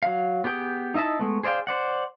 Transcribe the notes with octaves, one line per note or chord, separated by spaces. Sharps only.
F#3 F5
B3 G4 G#4 G5
D#4 E4 D#5 E5 A5
G#3 A3 B3
G#4 C5 D5 F5 G5
C5 D5 F#5